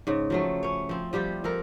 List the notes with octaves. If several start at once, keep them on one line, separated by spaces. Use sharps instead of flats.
G#2 C#3
F3 F#3 A3
C#4 C#5
F3 C4
F3 G3 G4 G5
F3 A4 A#4